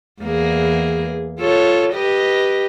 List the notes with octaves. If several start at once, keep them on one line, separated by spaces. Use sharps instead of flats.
E2 A#3 G#4
F4 A4 C#5
G4 B4 D#5